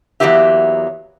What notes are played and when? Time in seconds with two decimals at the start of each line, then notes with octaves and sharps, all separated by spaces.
0.20 E2 F3 F#3 A#3 G4 E5